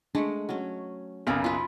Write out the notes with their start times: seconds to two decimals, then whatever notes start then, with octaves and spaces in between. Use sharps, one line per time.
0.15 G#3 A3 D4 F#5
0.49 F#3 C#4
1.27 B1 F#2 C#3 A#4 A#5 B5
1.44 F4 B4